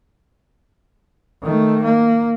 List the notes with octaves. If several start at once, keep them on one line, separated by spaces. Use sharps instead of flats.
D#3 A3
A#3